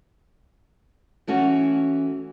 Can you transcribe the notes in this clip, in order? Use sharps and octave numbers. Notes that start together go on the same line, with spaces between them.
E3 A3 C#4 F#4